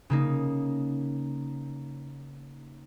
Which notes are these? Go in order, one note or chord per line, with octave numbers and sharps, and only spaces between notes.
C#3 A#3 D#4